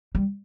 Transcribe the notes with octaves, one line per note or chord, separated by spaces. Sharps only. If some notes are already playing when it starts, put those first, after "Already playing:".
G3